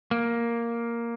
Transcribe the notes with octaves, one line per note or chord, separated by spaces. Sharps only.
A#3